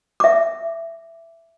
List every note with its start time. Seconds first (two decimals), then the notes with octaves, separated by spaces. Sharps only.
0.20 E5 D6